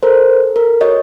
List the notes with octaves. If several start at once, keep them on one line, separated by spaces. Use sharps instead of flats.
A4 A#4 C5
A4
A#4
F#4 C#5 D#5